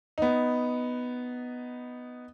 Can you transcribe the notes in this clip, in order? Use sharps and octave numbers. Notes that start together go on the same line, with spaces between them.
B3 D#4